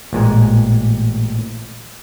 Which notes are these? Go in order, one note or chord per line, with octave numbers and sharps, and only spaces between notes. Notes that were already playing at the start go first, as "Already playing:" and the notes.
A1 A#2 G#3